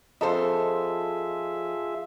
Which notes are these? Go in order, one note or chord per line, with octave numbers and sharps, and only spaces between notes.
F2 F4 G#4 A4 C5 D#5 E5